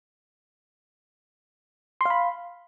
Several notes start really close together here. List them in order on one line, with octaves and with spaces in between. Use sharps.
C6 F5 B5